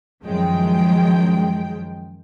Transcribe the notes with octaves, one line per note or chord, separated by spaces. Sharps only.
F#2 D#3 F3 G#3 G5